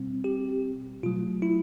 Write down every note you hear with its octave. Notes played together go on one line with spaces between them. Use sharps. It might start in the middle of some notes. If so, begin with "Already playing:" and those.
Already playing: B2 G3 C4
G4
B2 F#3 A3 F4
E4